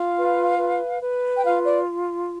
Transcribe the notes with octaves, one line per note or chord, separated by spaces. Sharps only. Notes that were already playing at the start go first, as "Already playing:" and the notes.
Already playing: F4 F5
B4
B4
B4
G5
F4 F5
D5